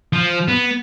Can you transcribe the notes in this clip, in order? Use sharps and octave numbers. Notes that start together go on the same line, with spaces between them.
F3
B3